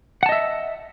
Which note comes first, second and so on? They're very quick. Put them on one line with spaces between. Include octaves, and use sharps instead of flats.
F#5 A5 D#5 E5